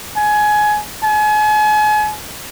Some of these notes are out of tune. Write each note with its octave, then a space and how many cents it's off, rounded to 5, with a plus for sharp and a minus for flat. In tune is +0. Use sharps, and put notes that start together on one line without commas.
G#5 +20
G#5 +35